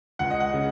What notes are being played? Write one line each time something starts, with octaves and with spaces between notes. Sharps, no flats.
C#2 F#5
D#5
F#5
C#3